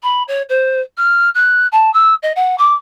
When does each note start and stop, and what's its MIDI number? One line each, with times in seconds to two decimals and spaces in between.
0.02 0.23 83
0.28 0.42 73
0.49 0.80 72
0.97 1.29 89
1.34 1.67 90
1.72 1.92 81
1.93 2.14 88
2.22 2.32 75
2.36 2.57 78
2.58 2.73 86